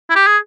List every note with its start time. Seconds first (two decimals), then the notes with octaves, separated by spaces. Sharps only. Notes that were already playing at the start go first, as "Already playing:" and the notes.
0.10 E4
0.16 G4
0.27 G#4